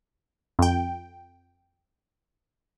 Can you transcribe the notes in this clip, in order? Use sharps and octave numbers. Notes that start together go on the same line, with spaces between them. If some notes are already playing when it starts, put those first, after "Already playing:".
F2 G5